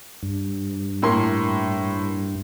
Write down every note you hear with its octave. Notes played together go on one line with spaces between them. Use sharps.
G2
A2 A#3 C6